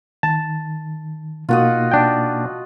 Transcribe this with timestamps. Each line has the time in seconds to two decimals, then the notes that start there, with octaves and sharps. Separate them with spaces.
0.23 D#3 A5
1.49 B2 A#3 D#4 F4 F#4 D#5
1.91 D4 G5